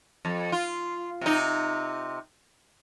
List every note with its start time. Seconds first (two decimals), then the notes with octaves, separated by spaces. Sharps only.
0.25 F2
0.52 F4
1.21 C3 D#4